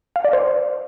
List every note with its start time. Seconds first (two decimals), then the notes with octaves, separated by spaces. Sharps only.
0.16 F5
0.25 D5
0.33 C5